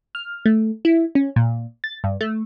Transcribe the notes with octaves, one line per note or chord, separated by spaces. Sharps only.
F6
A3
E4
C#4
A#2
A6
G2
A3